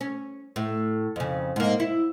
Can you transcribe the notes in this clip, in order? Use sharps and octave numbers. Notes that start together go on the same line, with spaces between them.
C#4
A2
F2 C#3
G#2 A#3
E4